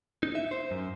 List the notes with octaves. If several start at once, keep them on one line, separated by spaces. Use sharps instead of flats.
D#4
E5
C5
F#2